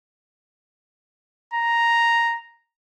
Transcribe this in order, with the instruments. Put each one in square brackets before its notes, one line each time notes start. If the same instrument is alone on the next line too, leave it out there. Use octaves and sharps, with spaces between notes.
[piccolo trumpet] A#5